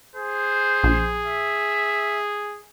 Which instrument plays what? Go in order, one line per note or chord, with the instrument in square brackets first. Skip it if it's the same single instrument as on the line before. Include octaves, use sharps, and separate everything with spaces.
[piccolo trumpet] G#4 [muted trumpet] C5
[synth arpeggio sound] A#1
[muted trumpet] E5